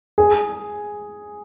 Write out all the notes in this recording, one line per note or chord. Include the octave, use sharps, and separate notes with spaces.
G#4